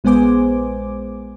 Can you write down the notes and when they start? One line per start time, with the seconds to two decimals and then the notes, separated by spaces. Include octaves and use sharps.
0.04 A#1 G#3 B3 C5 G#5 D6